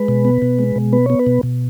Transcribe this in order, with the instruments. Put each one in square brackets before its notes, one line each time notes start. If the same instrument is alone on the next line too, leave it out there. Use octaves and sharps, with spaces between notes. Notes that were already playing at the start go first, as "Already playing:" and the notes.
Already playing: [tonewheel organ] G#3 B4
B2
B3
B2
G#3
B2
B3 B4
B3 C#5
B4
B2
B2